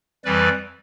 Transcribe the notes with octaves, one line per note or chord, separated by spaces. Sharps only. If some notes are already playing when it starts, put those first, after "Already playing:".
F2 E3 G3 B4 D5